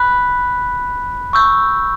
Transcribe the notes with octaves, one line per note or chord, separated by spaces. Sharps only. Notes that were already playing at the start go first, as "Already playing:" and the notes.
Already playing: B5 F#6 B6
C#6 E6 G6